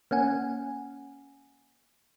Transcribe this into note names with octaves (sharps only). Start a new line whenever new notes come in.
A#3 C#4 F#5 G#5